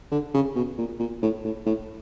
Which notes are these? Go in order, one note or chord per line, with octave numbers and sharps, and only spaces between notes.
D3
C#3
B2
A#2
A#2
A2
A2
A2